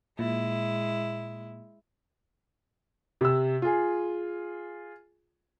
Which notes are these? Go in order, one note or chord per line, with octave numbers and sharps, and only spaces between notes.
A#2 G#3 E4
C3 E6
F4 G#4